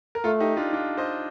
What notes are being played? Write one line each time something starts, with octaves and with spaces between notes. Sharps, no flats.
A#4
A3 F4 A4
D#4 G4
D4 F4
D4 F4
C5 D#5